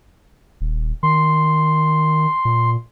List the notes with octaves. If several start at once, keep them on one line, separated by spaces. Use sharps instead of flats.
D#1
D#3 C6
A#2